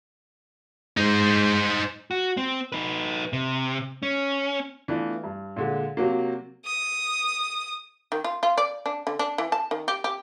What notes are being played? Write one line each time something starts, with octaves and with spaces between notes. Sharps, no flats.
G#2 D#4 C5
F#4
C4
D#4 B4
C3
C#4
E3 A3 B3 D4 F4
G2
A#2 D3 G#3
C3 F#3 A#3
D#6
D#3
F4
F4
D5
D4
D3
D4
E3
A5
D#3
G4
G4